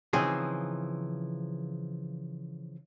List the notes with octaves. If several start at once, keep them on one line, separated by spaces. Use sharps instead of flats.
C#3 E3 F3 C4 D#4 G#4